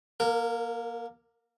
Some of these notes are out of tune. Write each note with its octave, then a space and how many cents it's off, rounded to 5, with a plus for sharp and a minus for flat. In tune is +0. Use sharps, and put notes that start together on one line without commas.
A#3 +20 A#4 -25